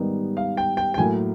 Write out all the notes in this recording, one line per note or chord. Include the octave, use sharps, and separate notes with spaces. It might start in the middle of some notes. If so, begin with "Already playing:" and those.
Already playing: G#2 D#3 G3 B3 D#4
F5
G5
G5
G5
A2 F#3 A#3 G#5